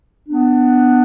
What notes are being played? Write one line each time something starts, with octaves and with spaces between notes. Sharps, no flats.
B3 D4